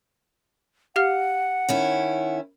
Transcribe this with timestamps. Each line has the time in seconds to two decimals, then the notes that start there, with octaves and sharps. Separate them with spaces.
0.96 G4 F5 F#5 F6
1.69 D#3 C#4 E4